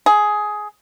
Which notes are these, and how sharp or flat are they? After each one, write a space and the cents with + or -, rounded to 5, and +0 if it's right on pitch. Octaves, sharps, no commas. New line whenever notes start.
G#4 +10